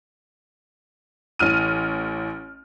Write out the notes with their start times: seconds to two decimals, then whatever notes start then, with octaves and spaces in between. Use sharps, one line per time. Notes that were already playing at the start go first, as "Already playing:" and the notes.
1.39 A1 E3 F6 D#7